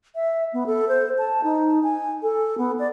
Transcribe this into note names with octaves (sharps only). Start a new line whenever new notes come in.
E5
B3
A4
C5
A5
D#4
G#5
A4
B3
D5